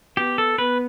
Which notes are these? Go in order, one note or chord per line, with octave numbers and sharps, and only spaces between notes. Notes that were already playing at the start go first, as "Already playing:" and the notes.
B3 G4
A4
B3 B4